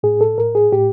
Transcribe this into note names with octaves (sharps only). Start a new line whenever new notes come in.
A2 G#4
A4
A2 A#4
G#4
A2 G4